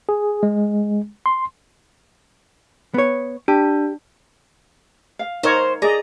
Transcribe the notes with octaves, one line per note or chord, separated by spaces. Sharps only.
G#4
G#3
C6
B3 C#5
D4 G4
F5
D#4 A#4 C5 C#5
G#4 D5 D#5 A#5